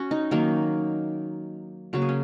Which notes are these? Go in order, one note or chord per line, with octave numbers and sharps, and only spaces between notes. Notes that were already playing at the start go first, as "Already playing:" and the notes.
Already playing: C#4 F#4
D#4
D#3 F#3 A#3
C#3 F#3 A#3 F#4
G#4
C#4